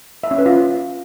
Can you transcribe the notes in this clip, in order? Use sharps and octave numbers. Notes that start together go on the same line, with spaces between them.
E5
C#4
B4
F4